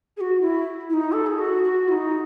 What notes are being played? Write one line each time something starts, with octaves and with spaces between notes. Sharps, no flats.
G#4
F#4
E4
E4
D#4
A4
G#4
F#4
F#4
E4
D#4